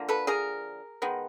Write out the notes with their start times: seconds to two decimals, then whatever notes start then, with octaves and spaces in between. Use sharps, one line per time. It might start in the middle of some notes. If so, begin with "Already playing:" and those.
Already playing: D3 F3 A#3
0.09 A4 B4
0.27 G#4 A#4
1.02 D#3 G#3 B3